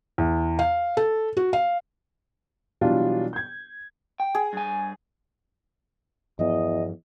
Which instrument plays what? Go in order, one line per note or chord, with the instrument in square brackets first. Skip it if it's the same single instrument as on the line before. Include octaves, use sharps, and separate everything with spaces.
[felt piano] E2
F5
A4
F#4
F5
[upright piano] B2 E3 F#3 G3 D4 F4
G6 G#6
[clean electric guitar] G5
[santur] G#4
[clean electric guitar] G2 G#5
[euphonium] E2 [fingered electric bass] G2 F3 B3 [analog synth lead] D#5